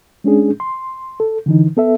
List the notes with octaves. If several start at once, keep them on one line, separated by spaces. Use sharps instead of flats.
G#3 C#4 D4 G#4
C6
A4
D3 E3 D#4
B3 A4 E5